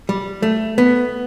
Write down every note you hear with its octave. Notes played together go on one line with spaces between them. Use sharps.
G3
A3
B3